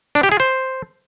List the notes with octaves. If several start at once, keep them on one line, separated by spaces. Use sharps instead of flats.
D4
G4
G#4
C5